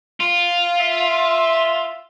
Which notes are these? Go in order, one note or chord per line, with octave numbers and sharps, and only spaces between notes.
F4
E5